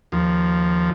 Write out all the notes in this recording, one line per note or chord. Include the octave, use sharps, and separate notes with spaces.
D#2 F3